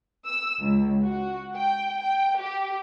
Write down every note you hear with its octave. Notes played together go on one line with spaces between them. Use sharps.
E6
C#2
F#4
G5
G5
G4